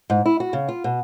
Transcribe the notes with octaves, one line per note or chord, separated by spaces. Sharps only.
G#2
E4
F#4
C#3
F4
B2